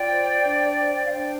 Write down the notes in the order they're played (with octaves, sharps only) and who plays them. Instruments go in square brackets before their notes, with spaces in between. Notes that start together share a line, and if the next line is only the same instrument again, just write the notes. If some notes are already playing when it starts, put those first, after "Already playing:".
Already playing: [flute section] F4 D5 G5
C5
D4
C5
F5
D4 D5 G5